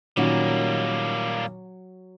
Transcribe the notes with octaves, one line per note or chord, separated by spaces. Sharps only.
A#2 D#3 F#3 G3 A#3 C#4